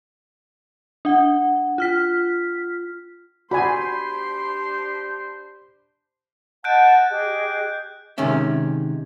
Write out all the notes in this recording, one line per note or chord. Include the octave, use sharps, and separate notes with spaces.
D4 F#5
F4 F6 B6
D4 F#4 G4 C5 D5 G#5 B5 C6
D#5 F#5 A5 F#6 G6 D7
G4 G#4 D#5
C3 D#3 G#3 C#4 E5